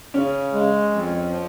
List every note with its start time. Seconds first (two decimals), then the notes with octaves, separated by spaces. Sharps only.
0.14 C#3 C#4
0.53 G#3
0.91 F2
1.29 F3